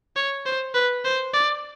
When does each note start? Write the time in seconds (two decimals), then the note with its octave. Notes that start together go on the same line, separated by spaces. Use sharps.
0.16 C#5
0.46 C5
0.74 B4
1.05 C5
1.34 D5